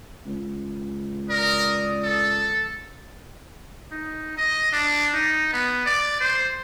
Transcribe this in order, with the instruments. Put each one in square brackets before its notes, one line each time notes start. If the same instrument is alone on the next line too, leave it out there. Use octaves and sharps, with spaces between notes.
[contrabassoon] C#2
[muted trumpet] A#4 [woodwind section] D5 D#6
[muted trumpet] A4
D#4
D#5
D4
D#4
B3
D5
C5